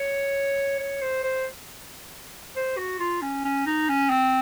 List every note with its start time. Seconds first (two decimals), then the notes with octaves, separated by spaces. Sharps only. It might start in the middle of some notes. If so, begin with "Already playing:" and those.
Already playing: C#5
0.79 C#5
1.02 C5
1.23 C5
2.56 C5
2.77 F#4
3.00 F4
3.22 C#4
3.44 C#4
3.66 D#4
3.89 C#4
4.10 C4